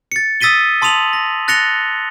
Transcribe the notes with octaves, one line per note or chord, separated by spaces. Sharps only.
A6 C#7
D#6 E6 A6 B6 D#7 G7
A5 C6 D#6 D#7 F7 F#7
A#6
F#6 A6 A#6 C#7 F7 G7